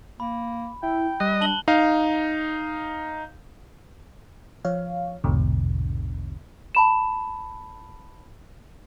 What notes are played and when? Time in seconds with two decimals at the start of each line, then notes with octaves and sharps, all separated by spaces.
0.20 A#3 B5
0.83 E4 G5
1.20 G3 D#5 F#6
1.41 D4 A5 F#7 G7
1.68 D#4 F5
4.65 F3 C#5 F5
5.24 A#1 E2 G#2 B2 D3
6.75 A5 B5 E7